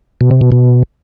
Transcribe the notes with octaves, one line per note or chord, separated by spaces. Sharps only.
B2
C3
B2
B2